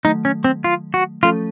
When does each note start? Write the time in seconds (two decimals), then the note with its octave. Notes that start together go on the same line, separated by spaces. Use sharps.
0.04 D#3 F#3 A3 D#4
0.25 C#4
0.44 C4
0.64 F4
0.94 F#4
1.23 F3 A3 C#4 F4 A4